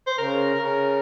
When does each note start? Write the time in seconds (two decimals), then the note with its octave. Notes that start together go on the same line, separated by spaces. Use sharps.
0.07 C5
0.18 C#3 A#4
0.57 C#3